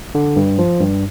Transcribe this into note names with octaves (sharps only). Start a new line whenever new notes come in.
D3
G2
F3
G2